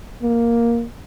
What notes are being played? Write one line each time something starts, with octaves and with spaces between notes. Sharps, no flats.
A#3